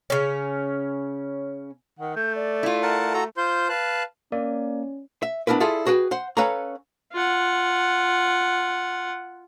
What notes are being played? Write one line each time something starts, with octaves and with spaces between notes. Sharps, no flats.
C#3 C#4
D#3 F#5
A3 G6
D5
E4 F4
A#4 F#5 A5
F#4 A4 A#5
F4 C5 C6 G6
B4 F5 A5 F#6
A#3 C#4 D5
E5
B3 D4 E4 A#4 B4
E4 F4 G#4 A4 D5 E5
F#4 G#4 B4 G5
C5 F#5
C#4 A4 B4 C#5 F5 A#5
F4 F#5